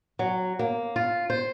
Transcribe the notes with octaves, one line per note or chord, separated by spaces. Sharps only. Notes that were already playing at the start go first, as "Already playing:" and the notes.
F#3
A#3
F4
C5